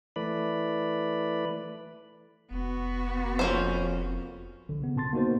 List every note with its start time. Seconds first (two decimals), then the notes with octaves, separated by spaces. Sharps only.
0.16 E3 A3 B4 D5 B5
2.51 F1 B3 F#4
3.39 F2 A#3 C#4 C5
4.69 A#1 D3
4.82 C#3 B3
4.96 A#2 C4 A5 C6 A6
5.13 A#3 B3 D#4 F#4 A#4 C5